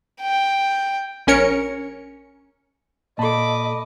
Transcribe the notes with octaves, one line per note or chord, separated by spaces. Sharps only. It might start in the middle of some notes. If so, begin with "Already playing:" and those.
G5
A#1 C#4 A#4 C#5 C#7
A#2 A4 D#5 A5 B5 D6